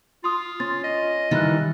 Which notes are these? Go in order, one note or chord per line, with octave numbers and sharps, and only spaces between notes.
F4 C6 D#6
C#4 C6 A6
D#5
D#3 E3 G3 F#6 A6